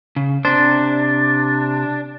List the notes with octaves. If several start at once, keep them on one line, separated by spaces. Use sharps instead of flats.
C#3
C3 D4 C5